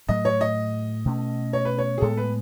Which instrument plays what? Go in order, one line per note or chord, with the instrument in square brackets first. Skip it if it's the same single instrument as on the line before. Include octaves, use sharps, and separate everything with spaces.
[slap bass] A2 F#3 A3 [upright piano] D#5
[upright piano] C#5
D#5
[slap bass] B2 A3 C#4
[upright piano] C#5
B4
C#5
G#4
[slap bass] A2 G#3 B3 [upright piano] A4
[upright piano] B4